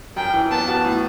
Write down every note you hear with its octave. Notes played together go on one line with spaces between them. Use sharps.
F#2 G5
E3
B3 A5
F#4
A2